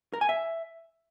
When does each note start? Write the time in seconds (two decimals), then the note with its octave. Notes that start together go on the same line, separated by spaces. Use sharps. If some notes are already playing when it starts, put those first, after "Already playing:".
0.14 A#4
0.21 G#5
0.29 E5